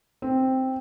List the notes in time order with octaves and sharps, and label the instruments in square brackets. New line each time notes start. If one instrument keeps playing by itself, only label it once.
[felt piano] C4